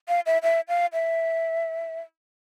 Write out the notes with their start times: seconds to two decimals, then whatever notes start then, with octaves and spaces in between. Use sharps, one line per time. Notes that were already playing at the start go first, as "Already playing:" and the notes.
0.08 F5
0.26 E5
0.43 E5
0.68 F5
0.93 E5